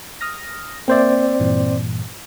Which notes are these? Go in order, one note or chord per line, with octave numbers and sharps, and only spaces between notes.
D#6 F6 A#6
A#3 C4 C5 D5 E5
G2 A#2 E3